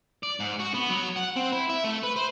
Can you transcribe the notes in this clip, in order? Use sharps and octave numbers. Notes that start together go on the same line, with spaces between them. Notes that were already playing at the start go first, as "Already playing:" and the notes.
D5
G#2
F#4
B3
F#3
F#5
C4
E4
E5
A3
B4
C5